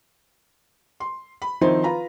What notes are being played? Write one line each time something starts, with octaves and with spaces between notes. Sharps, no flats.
C6
B5
D#3 F3 C4 D#4 E4 C5
F4 B4 A#5 B5